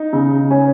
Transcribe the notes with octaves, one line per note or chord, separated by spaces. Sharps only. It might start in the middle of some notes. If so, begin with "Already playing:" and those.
Already playing: D#4
C#3
C#4